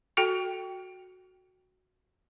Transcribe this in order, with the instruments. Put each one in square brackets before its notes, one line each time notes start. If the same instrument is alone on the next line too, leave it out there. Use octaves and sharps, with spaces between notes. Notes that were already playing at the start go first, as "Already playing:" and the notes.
[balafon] F#4 A4 G5